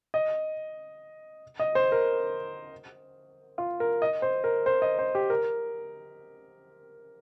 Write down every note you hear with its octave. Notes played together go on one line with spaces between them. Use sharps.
D#5
D#5
C5
A#4
F4
A#4
D#5
C5
A#4
C5
D#5
C5
G4
A#4